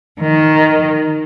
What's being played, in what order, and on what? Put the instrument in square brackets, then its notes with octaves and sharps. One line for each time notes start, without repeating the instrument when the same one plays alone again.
[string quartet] D#3